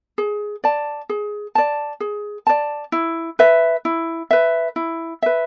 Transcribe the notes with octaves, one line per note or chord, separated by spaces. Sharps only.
G#4
D5 A5
G#4
D5 A5
G#4
D5 A5
E4
B4 E5
E4
B4 E5
E4
B4 E5